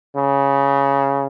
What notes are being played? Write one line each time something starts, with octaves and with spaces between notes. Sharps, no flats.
C#3